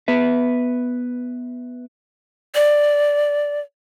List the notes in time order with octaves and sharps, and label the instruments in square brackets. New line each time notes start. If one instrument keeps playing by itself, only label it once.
[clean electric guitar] B3 B4 E5
[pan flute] D5